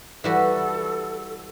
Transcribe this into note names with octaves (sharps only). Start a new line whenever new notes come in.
E3 G3 F#4 A4